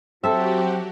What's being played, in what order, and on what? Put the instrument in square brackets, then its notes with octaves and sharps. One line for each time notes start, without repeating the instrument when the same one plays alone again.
[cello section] F#3 [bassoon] C4 [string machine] F#4 G4 [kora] A4 E5